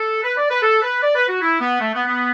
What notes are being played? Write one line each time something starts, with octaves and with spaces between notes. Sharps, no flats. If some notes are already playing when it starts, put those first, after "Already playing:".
Already playing: A4
B4
D5
B4
A4
B4
D5
B4
F#4
E4
B3
A3
B3
B3